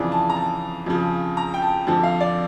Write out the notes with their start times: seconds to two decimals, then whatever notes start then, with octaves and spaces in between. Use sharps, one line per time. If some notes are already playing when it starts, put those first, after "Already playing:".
Already playing: F2 C#3 E3 D5
0.12 A5
0.30 A#5
0.36 A5
0.86 F2 C#3 F3
1.37 A#5
1.54 G5
1.62 A5
1.87 F2 D3 F3 A5
2.03 F5
2.20 D5